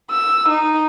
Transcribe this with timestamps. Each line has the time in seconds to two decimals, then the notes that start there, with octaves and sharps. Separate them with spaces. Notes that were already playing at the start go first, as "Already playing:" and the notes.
0.12 E6
0.49 D#4